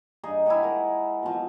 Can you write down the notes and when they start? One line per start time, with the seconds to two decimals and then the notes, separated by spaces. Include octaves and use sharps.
0.23 G2 D#4 G#4 D#5
0.46 E4 G4 G#4 F#5
0.63 G#3 A#4
1.23 B2 F3